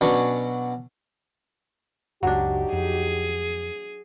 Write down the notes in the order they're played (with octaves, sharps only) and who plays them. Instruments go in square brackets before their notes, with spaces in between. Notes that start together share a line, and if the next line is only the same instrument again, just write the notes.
[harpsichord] B2 F#3 C#4 D4
[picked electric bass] F#1 C#2 [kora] F#3 D4 [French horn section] D#4 F#4 G4
[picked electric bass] F2 [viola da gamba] G#4